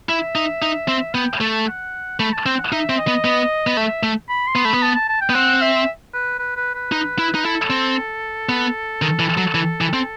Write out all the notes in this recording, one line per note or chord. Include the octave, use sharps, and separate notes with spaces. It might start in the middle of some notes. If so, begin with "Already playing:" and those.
E4 E5
D#4
D#4
C4
B3 G5
A3 A5
F#5
A3 B5
A5
C4 G5
F#5
D#4 E5
C4
D#5
B3
B3
B3
A3 E5
A3
B5
C6
B3
A3 B5
B3
A5
A5
A5
G5
B3
C4 F#5
E5
B4
B4
B4
B4
D#4
E4
D#4
E4 A4
C4
B3
D#3 A4
E3
F#3
E3
E3
C4